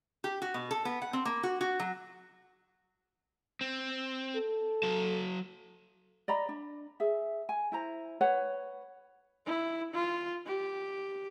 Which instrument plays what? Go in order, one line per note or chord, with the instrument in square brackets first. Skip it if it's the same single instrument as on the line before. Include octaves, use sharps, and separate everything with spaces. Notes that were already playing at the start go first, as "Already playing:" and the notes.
[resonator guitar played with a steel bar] G4
F#4
B2
A4
B3
F#5
C4
A#3
F#4
F#4
F#3
[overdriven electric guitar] C4
[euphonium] A4
[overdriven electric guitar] F#3 A5
[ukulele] D5 D#5 A#5 B5
D4
G#4 E5
G#5
E4 C5 A#5
B4 C#5 F#5
[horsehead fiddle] E4
F4
G4